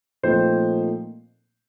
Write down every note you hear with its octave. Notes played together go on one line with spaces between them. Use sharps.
A#2 F3 A3 C4 D#4 C5